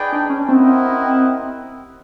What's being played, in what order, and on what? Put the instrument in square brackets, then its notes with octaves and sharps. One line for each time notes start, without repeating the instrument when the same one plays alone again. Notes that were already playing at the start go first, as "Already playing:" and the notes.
Already playing: [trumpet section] D#4 G#4 B4 D5 G5
[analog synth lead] D4
C#4
[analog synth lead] C4 [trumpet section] E4 G4 A#4 D#5 F#5